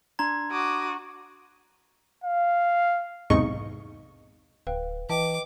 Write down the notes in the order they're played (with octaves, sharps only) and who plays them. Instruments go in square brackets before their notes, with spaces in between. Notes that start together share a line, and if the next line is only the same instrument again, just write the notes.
[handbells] D4 C6 G#6 [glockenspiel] A#5
[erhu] F#4 [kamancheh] D6 D#6
[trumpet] F5
[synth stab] B1 E2 G#2 C3 D#4 C#6
[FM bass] D1 [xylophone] B4 F5 G5
[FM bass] E3 [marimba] B4 D#5 G5 [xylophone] A5 [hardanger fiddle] D6